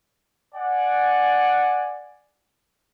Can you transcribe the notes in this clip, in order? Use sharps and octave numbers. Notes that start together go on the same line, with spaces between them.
D5 F#5 G#5